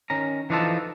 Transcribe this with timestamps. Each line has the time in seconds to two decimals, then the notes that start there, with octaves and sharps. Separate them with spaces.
0.10 D#3 C#4 A#5
0.50 E3 F3 D4 D#4 F4 A4